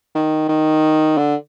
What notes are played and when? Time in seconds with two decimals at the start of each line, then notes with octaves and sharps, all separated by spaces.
0.15 D#3
0.49 D#3
1.18 D3